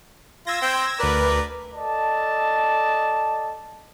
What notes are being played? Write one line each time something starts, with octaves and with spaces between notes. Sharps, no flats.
F4 E6 G#6 A#6
C4 G5 C6
D2 A#4 B4 D5
A4 D5 D#5 A5